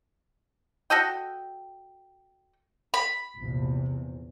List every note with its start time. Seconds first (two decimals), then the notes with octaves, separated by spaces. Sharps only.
0.90 F#4 A4 D#5 G5
2.94 B5
3.38 A#1 E2 C3